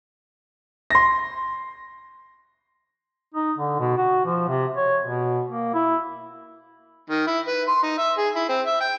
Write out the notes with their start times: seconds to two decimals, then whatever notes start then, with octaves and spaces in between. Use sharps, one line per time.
0.90 C6 A#6
3.34 D#4
3.58 D3
3.80 B2
3.97 F#4
4.25 F3
4.48 C3
4.77 C#5
5.05 B2
5.48 A#3
5.74 E4
7.10 D#3
7.27 E4
7.48 B4
7.68 C6
7.83 D#4
7.98 E5
8.18 G#4
8.36 E4
8.49 C4
8.66 E5
8.80 G5